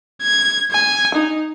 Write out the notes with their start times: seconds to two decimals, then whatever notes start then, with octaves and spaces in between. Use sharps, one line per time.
0.23 G#6
0.72 G#5
1.14 D#4